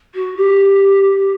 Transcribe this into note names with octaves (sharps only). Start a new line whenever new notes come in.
F#4
G4